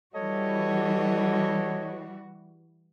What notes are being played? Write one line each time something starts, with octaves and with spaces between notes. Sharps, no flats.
E3 G3 F#4 A4 C#5 D#5